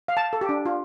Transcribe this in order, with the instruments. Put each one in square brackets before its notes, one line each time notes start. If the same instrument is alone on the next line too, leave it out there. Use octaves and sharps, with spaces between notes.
[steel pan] F5
A5
A4
G4
D4
F4